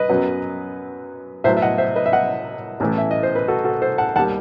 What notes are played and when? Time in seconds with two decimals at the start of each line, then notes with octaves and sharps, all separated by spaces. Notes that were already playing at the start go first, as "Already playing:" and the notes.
Already playing: B4 D#5
0.09 F#2 F#3 B3
1.44 A2 F#3 B3 C5 E5
1.57 E5
1.62 D#5 F#5
1.78 C5 E5
1.96 B4 D#5
2.06 E5
2.12 D#5 F#5
2.80 A1 A2 E3 A3
2.98 E5
3.11 D#5
3.23 C5
3.35 B4
3.48 F#4 A4
3.64 F#4 A4
3.82 A4 C5
3.98 F#5 A5
4.16 D#2 D#3 G3 F#5 A5